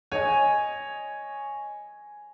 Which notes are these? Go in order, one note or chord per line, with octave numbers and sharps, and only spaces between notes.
C#5 D#5 G#5